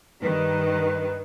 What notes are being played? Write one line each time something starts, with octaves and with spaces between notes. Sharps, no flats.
G2 D#3 B4